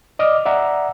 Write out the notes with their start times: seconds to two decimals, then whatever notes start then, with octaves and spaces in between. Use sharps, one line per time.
0.19 D5 D#5 D6 F6
0.46 D5 E5 F#5 A#5